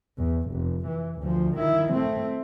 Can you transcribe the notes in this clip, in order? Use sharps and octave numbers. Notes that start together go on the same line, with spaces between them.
E2
F1
E3
D2 F3
D#3 E4
A3 C4